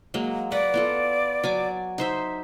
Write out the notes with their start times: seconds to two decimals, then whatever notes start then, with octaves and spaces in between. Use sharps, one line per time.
0.14 F#3 G#3 A#3
0.52 F#4 B4 D5 F#5
0.74 B3 F4 A4
1.44 F#3 G#5 D6
1.98 D#4 C5 E5